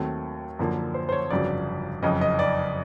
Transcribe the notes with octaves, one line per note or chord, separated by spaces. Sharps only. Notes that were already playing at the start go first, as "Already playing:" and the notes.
Already playing: D#2 D#3 F#3 A3 C4
F#2 D3 F3 A#3
C5
C5
C#5
G1 F2 C#3 F#3 D5
F#1 F2 C#3 D#5
D#5
D5